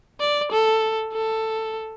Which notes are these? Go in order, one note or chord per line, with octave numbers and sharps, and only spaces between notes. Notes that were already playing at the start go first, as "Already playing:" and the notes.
D5
A4
A4